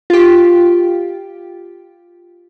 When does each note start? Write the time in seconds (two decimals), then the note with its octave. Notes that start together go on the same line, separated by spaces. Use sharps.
0.10 F4 G4